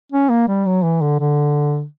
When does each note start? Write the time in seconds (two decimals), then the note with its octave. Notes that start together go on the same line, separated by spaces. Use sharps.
0.12 C#4
0.30 A#3
0.48 G3
0.66 F#3
0.83 E3
1.02 D3
1.20 D3